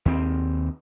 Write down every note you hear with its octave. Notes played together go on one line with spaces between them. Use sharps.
D#2 C4